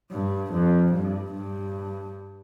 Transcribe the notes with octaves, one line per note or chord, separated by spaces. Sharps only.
G2
F2
G2
G2